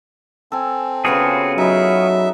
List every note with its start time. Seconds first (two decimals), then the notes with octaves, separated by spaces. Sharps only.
0.52 C4 A4 G#5
1.05 C#3 B3 F4 F#4 G#4 C6
1.58 F#3 D#4 E5 B5